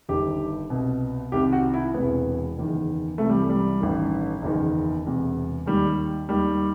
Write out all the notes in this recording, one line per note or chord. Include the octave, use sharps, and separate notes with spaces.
G1 G2 D#3 G4
C2 B2
C2 C3 D#3 G4
F#4
E4
E1 E2 C3 E3 B3
F#1 E2 D#3
C2 C3 E3 A3
G3
G3
A1 G2 D#3
F#1 E2 D#3
E1 E2 C3
D#2 D#3 G3
D#2 D#3 G3